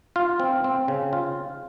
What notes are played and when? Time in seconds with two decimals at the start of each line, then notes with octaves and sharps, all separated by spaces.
0.16 F4
0.40 C4
0.64 C4
0.88 C#3
1.13 F4